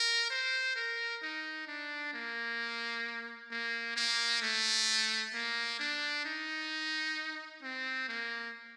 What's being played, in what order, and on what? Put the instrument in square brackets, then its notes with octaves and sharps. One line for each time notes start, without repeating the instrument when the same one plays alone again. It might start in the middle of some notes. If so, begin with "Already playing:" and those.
Already playing: [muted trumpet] A#4
C5
A#4
D#4
D4
A#3
A#3
A#3
A3
A#3
D4
D#4
C4
A#3